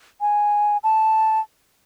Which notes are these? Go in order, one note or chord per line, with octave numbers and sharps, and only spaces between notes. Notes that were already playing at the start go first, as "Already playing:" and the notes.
G#5
A5